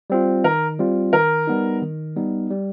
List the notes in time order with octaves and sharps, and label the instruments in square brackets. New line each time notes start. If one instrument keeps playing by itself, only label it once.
[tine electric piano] G3 C4 F4
[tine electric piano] D#3 [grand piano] A#4
[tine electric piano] G3 C4 F4
[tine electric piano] D#3 [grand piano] A#4
[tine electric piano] G3 B3 D#4
D#3
G3 B3 D#4
G3